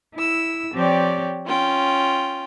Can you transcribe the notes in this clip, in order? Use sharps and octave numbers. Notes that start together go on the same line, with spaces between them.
E4 E6
F3 C4 G4 C#5 D5
C#4 F4 G5